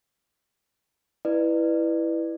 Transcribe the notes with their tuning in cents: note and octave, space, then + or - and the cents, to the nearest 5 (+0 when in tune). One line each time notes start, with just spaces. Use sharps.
E4 +0 B4 +0 D5 +35